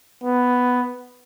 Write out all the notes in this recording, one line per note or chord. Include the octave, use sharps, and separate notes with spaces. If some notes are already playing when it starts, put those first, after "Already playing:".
B3